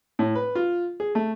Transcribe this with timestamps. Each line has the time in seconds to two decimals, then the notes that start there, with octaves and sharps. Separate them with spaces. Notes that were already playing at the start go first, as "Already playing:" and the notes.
0.19 A2
0.35 B4
0.55 F4
1.00 G#4
1.15 A3